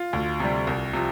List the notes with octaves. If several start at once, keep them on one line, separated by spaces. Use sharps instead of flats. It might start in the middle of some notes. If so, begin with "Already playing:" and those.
Already playing: F4
D2
C3 G3
C2
C3 F3